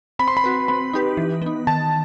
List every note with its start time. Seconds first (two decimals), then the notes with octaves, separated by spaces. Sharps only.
0.19 C4 B5
0.28 C6
0.37 B5
0.44 F#4 B4
0.68 C4 B5
0.93 D#4 G4 B4
1.17 E3
1.42 B3 D#4
1.67 D#3 A5